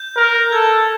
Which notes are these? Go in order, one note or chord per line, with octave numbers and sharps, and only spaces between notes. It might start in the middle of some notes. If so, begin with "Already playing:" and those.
Already playing: G6
A#4
A4 G#6